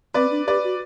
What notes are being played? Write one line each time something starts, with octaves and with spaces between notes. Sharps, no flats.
C4 B4 D5
D4
G4 B4 D5
F#4